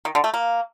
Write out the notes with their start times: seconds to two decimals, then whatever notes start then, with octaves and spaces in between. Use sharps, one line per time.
0.05 D#3
0.15 D3
0.24 A3
0.34 A#3